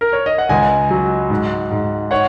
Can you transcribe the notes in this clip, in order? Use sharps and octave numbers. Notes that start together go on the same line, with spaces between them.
A#4
C#5
D#5
F#5
C#2 D#5 G#5
F#3
G#2
G#2
C#5 F#5